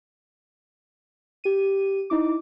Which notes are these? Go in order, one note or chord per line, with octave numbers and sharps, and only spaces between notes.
G4 D#7
D#4 E4 D6